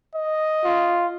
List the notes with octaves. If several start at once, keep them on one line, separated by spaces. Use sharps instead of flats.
D#5
F4